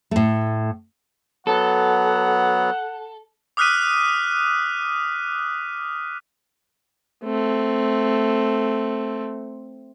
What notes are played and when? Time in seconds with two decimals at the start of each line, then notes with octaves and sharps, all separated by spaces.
0.11 A2 A3
1.47 F#3 B3 A4 F#5
3.57 D6 D#6 F6 F#6 B6 D#7
7.24 A3 C4